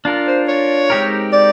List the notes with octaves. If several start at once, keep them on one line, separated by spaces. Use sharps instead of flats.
D4 F4 A#4
C5
C#5
G#3 C4 D#4 G4 A#4
D5